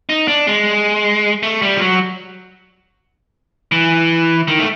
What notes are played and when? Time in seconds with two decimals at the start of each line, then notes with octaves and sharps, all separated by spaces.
0.09 D#4
0.28 D4
0.47 G#3
1.43 A3
1.62 G3
1.77 F3
1.81 F#3
3.72 E3
4.48 D#3
4.59 A3